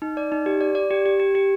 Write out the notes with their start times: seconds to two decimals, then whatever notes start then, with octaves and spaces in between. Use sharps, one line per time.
0.02 D#4
0.17 D5
0.32 D#4
0.46 G4
0.61 D5
0.75 D5
0.91 G4
1.06 G4
1.20 G4
1.35 G4